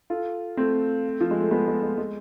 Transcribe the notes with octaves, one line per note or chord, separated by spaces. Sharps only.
F4 A4
A3 C4
F3
G#3
A3
G#3 B3
G#3
G#3
G#3